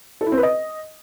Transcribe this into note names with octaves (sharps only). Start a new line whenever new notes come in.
A4
E4
C4
B4
D#5